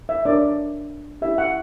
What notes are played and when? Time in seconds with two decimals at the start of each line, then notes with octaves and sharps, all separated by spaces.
0.09 E5
0.25 D4 A#4 C#5 D5
1.22 C#4 E4 G4 E5
1.38 F#5